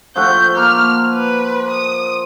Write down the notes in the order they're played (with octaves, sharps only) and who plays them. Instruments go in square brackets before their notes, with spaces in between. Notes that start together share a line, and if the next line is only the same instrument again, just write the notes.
[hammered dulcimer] F3 A3 F#5 [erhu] G6
[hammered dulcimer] A#3 [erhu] F6
[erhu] B4
D#6